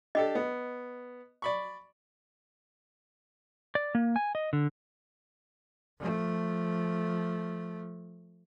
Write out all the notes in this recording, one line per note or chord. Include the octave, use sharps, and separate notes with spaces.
D4 G4 A4 D#5
B3
D5 B5 C#6
D5
A#3
G#5
D#5
D3
F3 A3